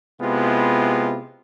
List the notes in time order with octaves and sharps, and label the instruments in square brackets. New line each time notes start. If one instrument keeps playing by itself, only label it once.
[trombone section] C3 G#3 B3 E4 F4 G4